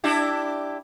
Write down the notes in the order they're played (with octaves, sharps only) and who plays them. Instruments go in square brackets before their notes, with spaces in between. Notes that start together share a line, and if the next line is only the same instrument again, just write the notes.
[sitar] D4 E4 G4